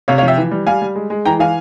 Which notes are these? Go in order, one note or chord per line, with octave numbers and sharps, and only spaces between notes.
C3 C#5 F5
C#5 F5
F3
E5 G5
E3
G3
G3 F5 G#5
G3
G#3
G#3
E3 G5 A#5
E3 F5 G#5